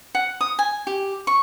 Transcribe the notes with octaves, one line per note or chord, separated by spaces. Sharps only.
F#5
D#6
G#5
G4
C#6